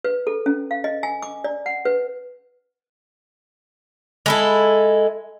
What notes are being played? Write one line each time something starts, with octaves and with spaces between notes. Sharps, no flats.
B4
A4
C#4
F5
D#5
G#5
D6
D5
F#5
B4
G#3 E4 A4